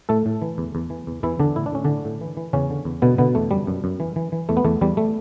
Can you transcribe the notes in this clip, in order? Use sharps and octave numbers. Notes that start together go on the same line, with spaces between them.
A2 A3 A4
A2
E3
E2
E2
E3
E2
E2 E3 E4
E2 D3 D4
A2 E4
D4
A2 C#4
A2 D3 D4
A2
E3
E3
E2 C#3 C#4
D3
E2
B2 D3 B3
B2 D3 B3
E2 A3
F#2 G3
F#2
F#2
E3
E3
E3
E2 A3
B3
E2 A3
E2 G3
A3